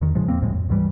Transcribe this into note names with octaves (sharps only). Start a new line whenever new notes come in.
E2 D#3
A2 C#3 F3 G#3
E2 A#3 C4
D2 A2 F3 G#3
F2
D2 G#2 E3 G3